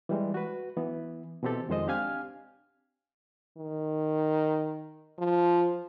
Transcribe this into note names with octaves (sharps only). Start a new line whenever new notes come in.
E3 G3 G#3
F#4 B4
E3 B3
B2 E3 C4 G4 A4
F2 D#3 G#3 C5 D#5
C4 D4 G4 F5 G#5 F6
D#3
F3